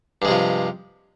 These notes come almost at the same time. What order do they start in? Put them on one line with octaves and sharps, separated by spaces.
G2 G#3 C3 F3